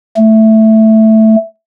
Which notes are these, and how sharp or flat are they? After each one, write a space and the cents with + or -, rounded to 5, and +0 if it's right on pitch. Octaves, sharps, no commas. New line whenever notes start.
A3 +0